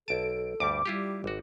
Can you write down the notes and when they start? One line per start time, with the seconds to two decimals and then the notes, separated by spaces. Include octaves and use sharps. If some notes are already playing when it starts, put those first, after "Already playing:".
0.08 B1 A4 A5 D7
0.60 D2 G2 G3 D6
0.86 G3 E4 F4 G4
1.24 G#1 F#4